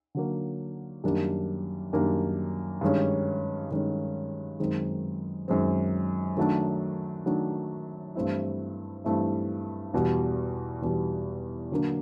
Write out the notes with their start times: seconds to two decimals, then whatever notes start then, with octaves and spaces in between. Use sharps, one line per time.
0.15 D3 F#3 A#3
1.04 F#2 D#3 G3 A#3 D4
1.93 F#2 D#3 G3 A#3 D4
2.81 G2 D#3 G#3 C#4
3.70 G2 D#3 G#3 C#4
4.60 F#2 D#3 G#3 C4
5.48 F#2 D#3 G#3 C4
6.37 D#3 F#3 A3 D4
7.26 D#3 F#3 A3 D4
8.15 G2 E3 A3 C4 E4
9.04 G2 E3 A3 C4 E4
9.94 E2 B2 G3
10.82 E2 B2 G3
11.72 D3 F#3 A#3 D4